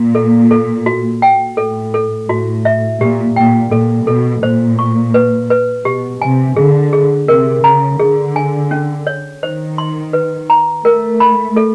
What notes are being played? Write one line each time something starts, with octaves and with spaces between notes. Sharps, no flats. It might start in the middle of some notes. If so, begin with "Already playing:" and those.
Already playing: A#2
A4
A4
F#4
G5
A2 A4
A4
A2 F#4
E5
A#2 G4
A#2 G5
A#2 A4
B2 A4
A#2 C5
C#6
B4
B4
B2 G4
C3 G#5
D3 G#4
G#4
C3 A#4
C#3 A#5
D3 G#4
G#5
C#4
C#5
D#3 C5
C6
B4
A#5
A3 A#4
B5
A4